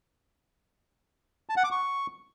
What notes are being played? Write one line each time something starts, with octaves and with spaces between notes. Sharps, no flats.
A5
F#5
D6
C#6